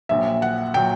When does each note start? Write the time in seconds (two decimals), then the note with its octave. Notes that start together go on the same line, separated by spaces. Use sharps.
0.09 A#1 A#2 F#3 E5
0.42 F#5
0.74 A#2 F#3 G5